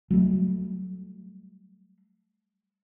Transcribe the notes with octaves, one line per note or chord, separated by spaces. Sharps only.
F#3 G3 A3